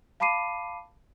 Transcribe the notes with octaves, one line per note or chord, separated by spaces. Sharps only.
F5 A5 B5 D6 C7 D#7